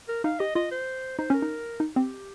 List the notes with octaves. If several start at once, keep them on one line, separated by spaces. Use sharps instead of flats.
A#4
D#4 F5
G4 D#5
F4 D#5
C5
D#4 C5
C#4 A#4
D#4
D#4
C4 G4